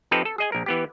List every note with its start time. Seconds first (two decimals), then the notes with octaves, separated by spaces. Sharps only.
0.11 F3 C4 D#4 G4 A4 B4
0.25 A4
0.38 G#4 D#5 G#5
0.52 A#1 A#4
0.66 E3 B3 G4